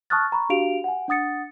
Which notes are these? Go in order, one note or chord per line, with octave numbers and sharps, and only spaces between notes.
A5 C#6 D#6 F6 F#6 A6
A#5 B5 C#6
D4 F#4 G4 F5 D7 F7
F#5 G#5
D4 F#5 D#6 A6 C#7